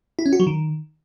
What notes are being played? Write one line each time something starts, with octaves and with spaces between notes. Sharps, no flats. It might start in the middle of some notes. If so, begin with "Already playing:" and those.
E4
C#4
F#4
F#3
D#3